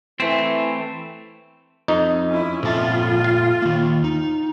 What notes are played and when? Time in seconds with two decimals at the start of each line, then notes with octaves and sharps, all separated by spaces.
0.20 E3 A3 C4
1.88 F2 D#4
2.29 C#4 E4
2.63 F2 A#2 F4 A4 E5 A5
3.24 F5
3.62 D#3 A#3
4.04 D#4